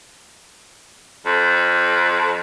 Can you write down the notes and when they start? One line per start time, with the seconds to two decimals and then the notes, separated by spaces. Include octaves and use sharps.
1.26 F2